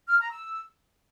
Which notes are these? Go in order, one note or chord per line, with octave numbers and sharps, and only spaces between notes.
F6
A#5
E6